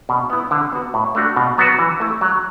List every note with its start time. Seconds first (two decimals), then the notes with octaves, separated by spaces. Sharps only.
0.09 B2
0.30 B3 E4
0.51 D3
0.72 B3 F#4
0.94 A2
1.15 A3 D4 F#4
1.36 B2
1.58 F#3 B3 F#4
1.79 E3
2.00 A3 E4
2.21 F#3